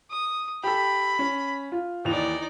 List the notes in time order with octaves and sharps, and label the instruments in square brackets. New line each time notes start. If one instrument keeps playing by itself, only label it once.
[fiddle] D#6
[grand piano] G4 A4 [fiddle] B5
[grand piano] C#4
F4
[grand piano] D#2 E3 F7 [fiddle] D#4 D5